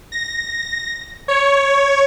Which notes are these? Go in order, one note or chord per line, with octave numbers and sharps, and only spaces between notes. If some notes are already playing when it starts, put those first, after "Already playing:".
A#6
C#5